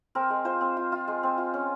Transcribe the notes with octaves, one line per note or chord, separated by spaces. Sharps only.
C4 A#4
G#3
F4 C5
C4
F4
F4
G#3
C4
F4
C#4